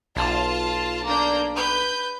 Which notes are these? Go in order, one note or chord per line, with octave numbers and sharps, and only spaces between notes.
B1 F4 A5
A#3 D4 G6
B4 G6